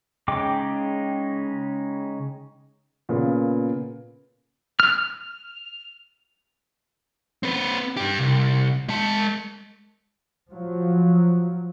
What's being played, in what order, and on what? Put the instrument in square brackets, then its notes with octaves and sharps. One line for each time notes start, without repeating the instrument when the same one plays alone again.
[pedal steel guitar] C#3 G#3 D#4 G5 D6
[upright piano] A#2 C#3 B3
[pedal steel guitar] F6
[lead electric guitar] C4 B4
G2 G4
C2
G#3 A5
[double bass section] F3 F#3